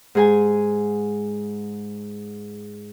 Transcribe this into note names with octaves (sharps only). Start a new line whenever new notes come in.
G#2 G#4 G#5